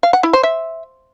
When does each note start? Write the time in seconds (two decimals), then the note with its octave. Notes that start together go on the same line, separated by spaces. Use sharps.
0.03 F5
0.13 F#5
0.23 E4
0.33 C5
0.43 E5